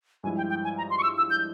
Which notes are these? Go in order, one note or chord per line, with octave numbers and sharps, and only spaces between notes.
G2 F3 G#3 E4 G#5
G5
G5
G#5
A#5
C6
C#6
E6
E6
G6